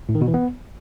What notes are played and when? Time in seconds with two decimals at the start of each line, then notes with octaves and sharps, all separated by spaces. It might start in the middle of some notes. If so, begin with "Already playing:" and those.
0.09 A2
0.15 D#3
0.21 B2
0.28 E3
0.34 B3